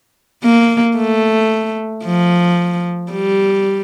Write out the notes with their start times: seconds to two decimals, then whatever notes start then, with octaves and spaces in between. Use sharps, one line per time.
0.44 A#3
0.97 A3
2.05 F3
3.12 G3